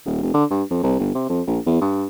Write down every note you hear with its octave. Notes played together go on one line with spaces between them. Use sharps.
D#1
F1
D3
G2
F2
C2
G1
C3
F2
A#1
E2
G2